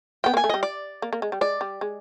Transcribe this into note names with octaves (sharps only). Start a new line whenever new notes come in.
B3 G5
A#3 G#5
A3
G3 D#5
D5
A#3
A#3
G#3
G3
G#3 D5
G3
G#3